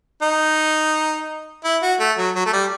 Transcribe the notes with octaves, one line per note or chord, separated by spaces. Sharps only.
D#4
E4
F#4
A3
F#3
F#3
A3
G3